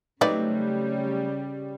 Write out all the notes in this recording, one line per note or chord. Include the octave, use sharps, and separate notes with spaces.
C#3 F#3 G3 A3 C4 D#4 B4 D5